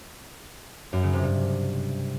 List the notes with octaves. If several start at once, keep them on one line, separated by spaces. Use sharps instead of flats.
F#2
C#3
C3
G2